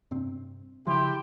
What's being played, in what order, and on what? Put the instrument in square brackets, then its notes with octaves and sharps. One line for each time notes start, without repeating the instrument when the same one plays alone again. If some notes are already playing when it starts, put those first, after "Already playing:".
[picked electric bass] G2 C3 C4
[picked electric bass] C#3 F3 F#3 [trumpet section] E4 G4 [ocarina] C6